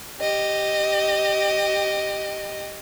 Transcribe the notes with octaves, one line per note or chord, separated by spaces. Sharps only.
G4 D#5